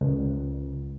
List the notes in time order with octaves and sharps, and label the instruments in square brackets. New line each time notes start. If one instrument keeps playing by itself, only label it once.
[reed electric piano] C#2